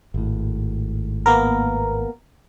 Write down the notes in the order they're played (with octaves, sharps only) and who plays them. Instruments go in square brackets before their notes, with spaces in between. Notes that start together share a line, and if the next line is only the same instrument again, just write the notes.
[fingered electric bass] G#1 A2
[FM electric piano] A#3 B3 A#4